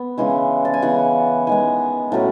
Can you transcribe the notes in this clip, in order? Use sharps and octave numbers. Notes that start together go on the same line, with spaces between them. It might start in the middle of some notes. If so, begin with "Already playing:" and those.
Already playing: B3
C#3 E3 G#3 G#5
A5
G#5
C#3 E3 B3 F#5
D#3 G#3 B3 G#5
A2 F#3 A3 C#4